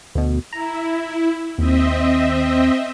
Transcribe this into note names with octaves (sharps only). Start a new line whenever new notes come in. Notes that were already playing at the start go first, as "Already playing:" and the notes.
D2 B2
E4 A#5
D#2 C4 D#5 E5